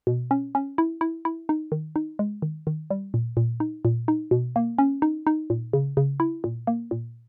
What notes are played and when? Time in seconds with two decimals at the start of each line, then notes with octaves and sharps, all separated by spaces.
0.07 B2
0.31 C#4
0.55 C#4
0.78 E4
1.01 E4
1.25 E4
1.49 D#4
1.72 D#3
1.96 D#4
2.19 G#3
2.42 D#3
2.67 D#3
2.91 G3
3.14 A#2
3.37 A#2
3.60 D#4
3.85 A#2
4.08 D#4
4.31 B2
4.56 A#3
4.79 C#4
5.02 D#4
5.27 D#4
5.50 A#2
5.73 C#3
5.97 C#3
6.20 E4
6.44 A#2
6.67 A#3
6.91 A#2